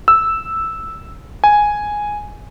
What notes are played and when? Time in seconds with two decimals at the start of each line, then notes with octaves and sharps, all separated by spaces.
0.08 E6
1.44 G#5